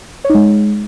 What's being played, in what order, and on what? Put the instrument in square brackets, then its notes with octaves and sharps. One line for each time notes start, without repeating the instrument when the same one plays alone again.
[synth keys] C#5
D#4
G#3